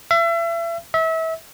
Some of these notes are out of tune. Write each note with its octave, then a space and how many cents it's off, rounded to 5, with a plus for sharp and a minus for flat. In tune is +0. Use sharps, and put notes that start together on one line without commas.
E5 +35
E5 -30